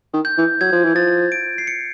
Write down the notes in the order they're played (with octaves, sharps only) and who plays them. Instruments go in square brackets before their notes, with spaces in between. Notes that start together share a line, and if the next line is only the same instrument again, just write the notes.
[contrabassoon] D#3
[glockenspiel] G6
[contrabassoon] E3
[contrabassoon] F#3 [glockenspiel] G#6
[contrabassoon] F3
E3
[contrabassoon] F3 [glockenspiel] A6
[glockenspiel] D7
C7
C#7